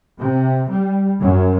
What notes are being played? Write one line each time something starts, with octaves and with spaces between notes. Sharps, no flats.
C3
G3
F#2